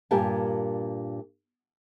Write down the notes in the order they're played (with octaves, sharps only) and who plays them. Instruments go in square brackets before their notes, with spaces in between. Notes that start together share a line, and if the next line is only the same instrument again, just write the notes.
[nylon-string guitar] G2 A#2 G4 A#4 G#5 A5